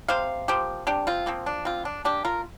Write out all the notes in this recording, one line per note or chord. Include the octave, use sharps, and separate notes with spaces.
C3 C5 F5
F3 A#3 G4 C5
C3 D4 G4
C4 F4
F3 A#3 C4
D4
D3 C4 F4
D4
A#3 D4 G4
F4 A#4